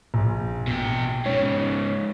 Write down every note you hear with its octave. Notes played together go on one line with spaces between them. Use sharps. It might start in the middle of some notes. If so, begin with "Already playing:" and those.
A#1
B2 G5
G#2 C#3 C#5